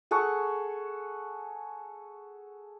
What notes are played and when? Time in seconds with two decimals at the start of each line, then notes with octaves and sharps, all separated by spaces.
0.11 G#4 A4 F#5 C#6